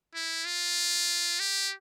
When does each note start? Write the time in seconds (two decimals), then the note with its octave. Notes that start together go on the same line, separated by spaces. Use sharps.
0.14 E4
0.45 F4
1.40 G4